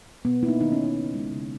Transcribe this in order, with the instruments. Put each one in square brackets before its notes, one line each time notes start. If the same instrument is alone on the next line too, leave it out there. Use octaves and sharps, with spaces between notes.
[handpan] B2 B3
A#3 E4
D#4
D#3 D#4
C#4
A#3
D#4
C#3
G#3
C#3